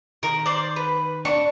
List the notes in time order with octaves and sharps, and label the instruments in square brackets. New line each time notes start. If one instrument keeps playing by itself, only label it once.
[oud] D#3 [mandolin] A#4
[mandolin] C5 D5
B4
[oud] D4 [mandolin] C#6